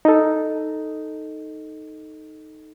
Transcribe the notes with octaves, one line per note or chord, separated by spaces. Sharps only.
D#4 A4